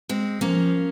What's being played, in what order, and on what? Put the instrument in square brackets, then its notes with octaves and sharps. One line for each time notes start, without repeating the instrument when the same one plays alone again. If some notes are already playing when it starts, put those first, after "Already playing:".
[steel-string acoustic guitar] G#3 C4
[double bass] F3 [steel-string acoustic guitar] A#3 C#4